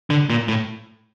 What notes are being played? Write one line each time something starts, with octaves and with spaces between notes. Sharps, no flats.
D3
A#2
A2